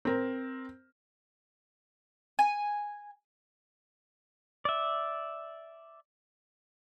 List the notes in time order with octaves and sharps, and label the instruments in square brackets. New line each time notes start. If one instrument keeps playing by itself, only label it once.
[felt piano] C4 A#4
[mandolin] G#5
[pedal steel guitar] D5 E5